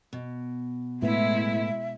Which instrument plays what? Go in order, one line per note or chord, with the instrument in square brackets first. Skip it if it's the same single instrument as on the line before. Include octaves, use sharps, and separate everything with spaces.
[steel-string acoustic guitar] B2
[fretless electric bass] A2 B3 [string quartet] G#3 E4 [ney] E5